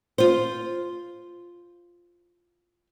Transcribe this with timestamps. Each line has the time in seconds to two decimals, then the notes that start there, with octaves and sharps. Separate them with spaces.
0.18 F4 C5